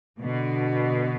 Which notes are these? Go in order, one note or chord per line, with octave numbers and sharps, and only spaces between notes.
B2 D3